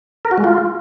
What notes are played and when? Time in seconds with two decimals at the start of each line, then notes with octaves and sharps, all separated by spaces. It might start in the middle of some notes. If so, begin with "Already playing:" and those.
0.25 A#4
0.31 F#4
0.38 G#3
0.44 F4